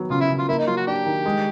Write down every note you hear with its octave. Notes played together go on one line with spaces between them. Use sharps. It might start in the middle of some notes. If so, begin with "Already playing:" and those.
Already playing: D#3 F#3 B3
C#3 F4
E4
C#3
F4
A#3 E4
D#4
F#3 F4
F#4
D4 G4
D#3
G#3